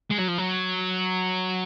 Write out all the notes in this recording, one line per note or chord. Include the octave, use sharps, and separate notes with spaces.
G#3
F#3
F3
F#3